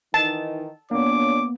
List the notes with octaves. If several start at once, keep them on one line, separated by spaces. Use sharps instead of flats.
D#3 E3 D#4 A5
A#2 A#3 B3 D4 C#5 D6